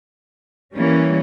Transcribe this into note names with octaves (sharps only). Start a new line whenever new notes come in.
E3 G3 A#3 C#4